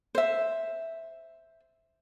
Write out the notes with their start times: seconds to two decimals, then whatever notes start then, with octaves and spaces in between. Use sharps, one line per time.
0.15 C5 E5